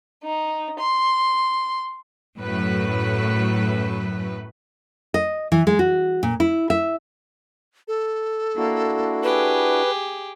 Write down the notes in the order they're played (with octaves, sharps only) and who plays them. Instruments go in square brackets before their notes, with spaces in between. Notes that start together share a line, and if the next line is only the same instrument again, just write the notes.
[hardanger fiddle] D#4
C6
[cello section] F#2 A2 F#3 A3 B4
[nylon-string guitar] D#5
E3
G#3
F#4
A#2
E4
E5
[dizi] A4
[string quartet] A#3 [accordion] D4 E4 F#4
[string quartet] G4 G#4 [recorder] B4